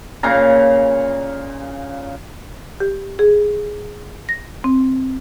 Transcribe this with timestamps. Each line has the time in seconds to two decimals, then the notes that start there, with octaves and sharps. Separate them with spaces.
0.23 A#2 C#3 F5 A#5
2.80 G4
3.19 G#4
4.29 A#6
4.64 C4